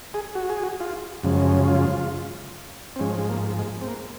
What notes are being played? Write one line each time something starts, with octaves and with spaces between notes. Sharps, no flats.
G#4
F#4
G#4
F#4
F4
F#2 C#3 F3 G#3
F4
C4
G#2 F3 G#3 C#4
G#3
A#3
G#3
C4
A#3